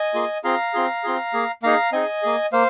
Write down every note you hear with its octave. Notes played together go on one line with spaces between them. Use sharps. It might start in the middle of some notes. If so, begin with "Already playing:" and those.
Already playing: D#5 G#5
A#3 F4 G#4
C4 F4 G#4 F5 A#5
C4 F4 G#4
C4 F4 G#4
A#3 G#4
A#3 D#4 G#4 F5 A#5
C4 D#4 G#4 D#5 G#5
A#3 G#4
A#3 C5 F5